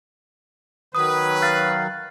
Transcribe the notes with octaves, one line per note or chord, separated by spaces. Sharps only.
D#3 F#3 B4 D#6
F5 F#6 A6